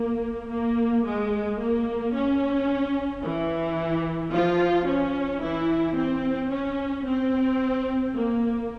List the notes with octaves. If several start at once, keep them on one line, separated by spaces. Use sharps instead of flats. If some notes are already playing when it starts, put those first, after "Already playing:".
Already playing: A#3
A#3
G#3
A#3
C#4
E3 E4
F3 F4
C#4
E3 E4
C4
C#4
C4
A#3